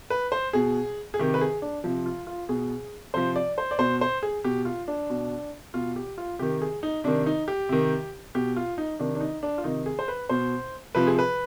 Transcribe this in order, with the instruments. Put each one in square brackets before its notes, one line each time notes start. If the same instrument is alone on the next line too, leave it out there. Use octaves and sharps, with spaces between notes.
[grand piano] B4
C5
B2 G#4
G#4
C3 D#3 G4
B4
G#4
D4
C3 F3
F4
F4
B2 G#4
C3 F3 C5
D5
C5
D5
B2 C5
C5
G#4
B2 G4
F4
D4
B2
B2 F4
G4
F4
C3 D#3 G4
G#4
D#4
C3 D#3 D4
D#4
G4
C3 D#3
B2 G4
F4
D#4
C3 D#3 D4
D4
D#4
D4
F4
C3 D#3 D#4
G#4
C5
B4
B2 C5
C3 F3 B4
G#4
B4